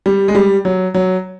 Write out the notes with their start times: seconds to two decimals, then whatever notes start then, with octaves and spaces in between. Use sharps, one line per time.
0.06 G3
0.28 G#3
0.35 G3
0.65 F#3
0.94 F#3